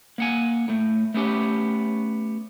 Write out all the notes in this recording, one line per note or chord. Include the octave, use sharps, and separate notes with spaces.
A#3 F#5 G#5
A2 A3
A3 B3 C#4 G4